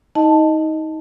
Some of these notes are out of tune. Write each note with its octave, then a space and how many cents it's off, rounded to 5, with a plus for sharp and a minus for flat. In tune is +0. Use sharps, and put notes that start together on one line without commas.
D#4 +25 D#5 +0 A5 +0